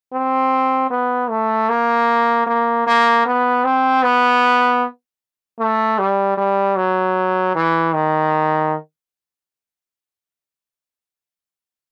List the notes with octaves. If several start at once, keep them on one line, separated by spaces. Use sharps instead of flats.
C4
B3
A3
A#3
A#3
A#3
B3
C4
B3
A3
G3
G3
F#3
E3
D#3